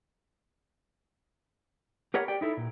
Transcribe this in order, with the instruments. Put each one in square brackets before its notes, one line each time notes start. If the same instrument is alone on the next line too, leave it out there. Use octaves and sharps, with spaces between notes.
[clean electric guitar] G4 A#4 B4 C#5 F#5
G4 D5 G5
D#4 E4 A4
A#2